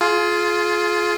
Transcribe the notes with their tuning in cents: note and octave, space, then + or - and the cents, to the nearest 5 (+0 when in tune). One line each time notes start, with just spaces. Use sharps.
F4 +0 G#4 +30